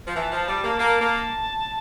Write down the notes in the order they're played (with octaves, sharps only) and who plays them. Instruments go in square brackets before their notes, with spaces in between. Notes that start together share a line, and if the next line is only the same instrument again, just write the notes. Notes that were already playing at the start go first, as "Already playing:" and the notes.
[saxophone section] F3
[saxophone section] E3 [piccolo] A5
[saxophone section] F3
G3
A#3
A#3
A#3